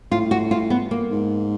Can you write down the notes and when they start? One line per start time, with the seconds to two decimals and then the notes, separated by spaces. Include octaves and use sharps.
0.12 A2 F4
0.31 F#4
0.51 F4
0.70 B3
0.91 A#3
1.11 G#2